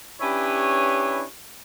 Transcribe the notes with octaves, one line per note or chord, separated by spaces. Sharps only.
C#4 D4 E4 G4 B4 C#5